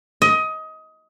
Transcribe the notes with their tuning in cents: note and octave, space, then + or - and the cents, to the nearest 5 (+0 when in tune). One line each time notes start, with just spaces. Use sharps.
D#5 +20